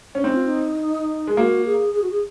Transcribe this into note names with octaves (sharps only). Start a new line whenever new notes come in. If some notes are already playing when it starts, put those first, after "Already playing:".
C#4
C4 D#4
F4
D#4
G#3
A#3 F#4
G#4
G#4
F#4
G#4